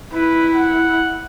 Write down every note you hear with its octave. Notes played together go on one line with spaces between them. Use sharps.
E4 B4
F#5